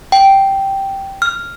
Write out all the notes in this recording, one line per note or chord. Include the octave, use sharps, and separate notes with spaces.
G5
F6